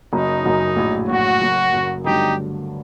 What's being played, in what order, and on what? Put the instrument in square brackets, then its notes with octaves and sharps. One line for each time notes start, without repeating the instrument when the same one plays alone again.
[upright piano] F#1 F#2 F#3 [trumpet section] D#4
[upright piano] F#1 F#2 F#3
A#1 A2 F#3
[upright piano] A#1 A2 F#3 [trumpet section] F#4
[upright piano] F#1 F#2 F#3
F#1 F#2 F#3
[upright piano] G1 G2 D3 F#3 A3 [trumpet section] D#4 G4